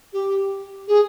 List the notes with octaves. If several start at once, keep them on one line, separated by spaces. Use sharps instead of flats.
G4
G#4